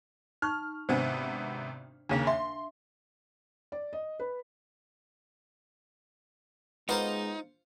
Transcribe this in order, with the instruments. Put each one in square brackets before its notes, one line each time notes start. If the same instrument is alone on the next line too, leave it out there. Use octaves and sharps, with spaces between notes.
[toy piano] D#4 C#6 [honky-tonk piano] F6
[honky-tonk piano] G#1 C3 B3 [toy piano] D4 C5
[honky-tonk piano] D#2 C#3 A#3 [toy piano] D4 F5
[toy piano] E5 [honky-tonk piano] C6
[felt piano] D5
D#5
B4
[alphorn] G#3 [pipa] A#3 B3 [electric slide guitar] D#4 [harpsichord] F4 C5 C6